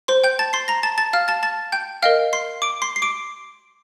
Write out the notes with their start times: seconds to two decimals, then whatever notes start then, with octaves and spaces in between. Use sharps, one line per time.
0.08 C5 C6
0.24 G5 G6
0.39 A5 A6
0.53 C6 C7
0.68 A#5 A#6
0.83 A5 A6
0.98 A5 A6
1.13 F5 F6
1.28 A5 A6
1.43 A5 A6
1.72 G5 G6
2.02 A#4 D#5 F5 G5 F6
2.33 C6 C7
2.62 D6 D7
2.82 C6 C7
2.96 C7
3.02 D6 D7